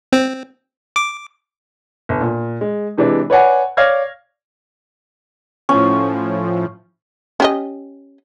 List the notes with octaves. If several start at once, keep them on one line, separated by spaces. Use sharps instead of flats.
C4
D6
G1
A#2
G#3
C3 E3 G#3 D4
B4 C#5 D5 F#5 G#5
C#5 D5 F5 F6 G#6 A#6
A2 F3 C#4
C#4 G4 D#5